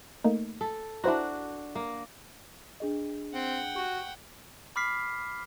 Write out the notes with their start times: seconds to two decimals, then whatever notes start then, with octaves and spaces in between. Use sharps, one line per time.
0.24 A3 A#3 D#4
0.61 A4
1.04 D4 E4 F#4 C5 A#5
1.75 A#3
2.80 D4 G#4 D#5
3.34 C4 F#5 G5
3.75 F#4 G4 C#6
4.76 B5 D6 F6 B6 C7